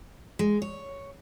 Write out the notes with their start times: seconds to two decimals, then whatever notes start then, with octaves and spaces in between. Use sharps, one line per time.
0.39 G#3
0.62 C#5